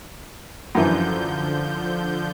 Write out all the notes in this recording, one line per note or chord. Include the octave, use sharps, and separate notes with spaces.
F#2 D3 E3 F3 G6